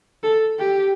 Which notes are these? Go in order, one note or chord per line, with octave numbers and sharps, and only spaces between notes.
A4
G4